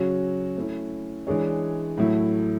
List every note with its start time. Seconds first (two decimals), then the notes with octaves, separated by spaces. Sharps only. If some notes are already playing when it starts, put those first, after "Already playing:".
Already playing: C#3 F#3 C#4 F#4
0.56 A3 C#4 E4
1.27 E3 G#3 D4 G#4 C#5
1.98 A2 F#3 A3 E4